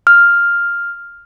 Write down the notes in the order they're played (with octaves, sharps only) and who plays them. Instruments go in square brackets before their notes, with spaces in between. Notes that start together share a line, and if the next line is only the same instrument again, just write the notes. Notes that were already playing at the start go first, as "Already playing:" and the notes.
[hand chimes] F6